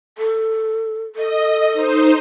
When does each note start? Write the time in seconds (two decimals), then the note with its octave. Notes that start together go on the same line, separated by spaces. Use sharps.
0.18 A4
1.15 A4 D#5
1.73 D#4 C5